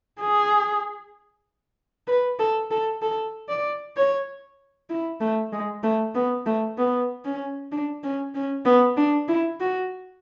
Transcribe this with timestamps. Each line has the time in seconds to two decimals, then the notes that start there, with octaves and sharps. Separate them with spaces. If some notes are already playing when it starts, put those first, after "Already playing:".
0.20 G#4
2.07 B4
2.39 A4
2.71 A4
3.02 A4
3.49 D5
3.96 C#5
4.90 E4
5.21 A3
5.52 G#3
5.83 A3
6.15 B3
6.46 A3
6.78 B3
7.25 C#4
7.72 D4
8.03 C#4
8.35 C#4
8.65 B3
8.97 D4
9.28 E4
9.60 F#4